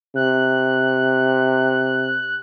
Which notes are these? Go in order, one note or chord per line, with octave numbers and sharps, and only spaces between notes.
C3 F#6